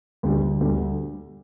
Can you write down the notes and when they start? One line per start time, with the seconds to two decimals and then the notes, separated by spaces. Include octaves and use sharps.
0.23 D2 D3 G3
0.60 D2 D3 G3